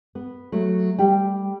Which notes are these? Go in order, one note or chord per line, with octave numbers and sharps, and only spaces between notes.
B3
F#3 A3
G3 G4 G5